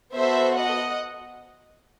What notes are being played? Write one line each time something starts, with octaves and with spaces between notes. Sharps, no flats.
B3 F#4 A4 C5 E5
D#5 F#5